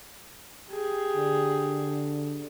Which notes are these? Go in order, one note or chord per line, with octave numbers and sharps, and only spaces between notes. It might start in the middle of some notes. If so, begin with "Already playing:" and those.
G4 G#4
D3